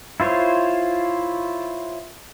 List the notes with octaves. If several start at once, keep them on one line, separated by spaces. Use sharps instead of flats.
E4 F4 C5 C#5